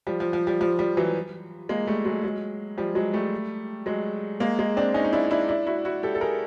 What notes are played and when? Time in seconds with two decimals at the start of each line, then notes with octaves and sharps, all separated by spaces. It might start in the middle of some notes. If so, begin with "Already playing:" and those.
0.07 F3 G3
0.20 F3
0.33 F3
0.47 F3 G3
0.60 F3 G3
0.79 F3 G3
0.97 E3 F#3
1.69 G#3 A#3
1.87 G3 A3
2.05 F#3 G#3
2.23 F#3 G#3
2.78 F3 G3
2.95 F#3 G#3
3.14 G3 A3
3.86 F#3 G#3
4.40 G#3 A#3
4.59 G#3 A#3
4.77 C4 D4
4.94 C#4 D#4
5.04 D#4
5.13 D4 E4
5.31 D4 E4
5.49 D4 E4
5.67 E4 F#4
5.85 E4 F#4
6.03 G4 A4
6.15 A4
6.21 G#4 A#4